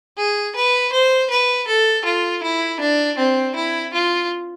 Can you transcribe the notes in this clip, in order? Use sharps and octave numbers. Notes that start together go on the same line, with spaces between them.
G#4
B4
C5
B4
A4
F4
E4
D4
C4
E4
F4